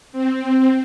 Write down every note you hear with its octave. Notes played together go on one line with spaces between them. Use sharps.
C4